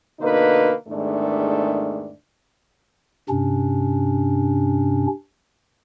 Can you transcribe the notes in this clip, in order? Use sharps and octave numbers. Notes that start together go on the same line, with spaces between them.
B2 D3 A#3 D#4 B4
E2 G#2 D#3 A3 D4
G2 C3 C#4 D4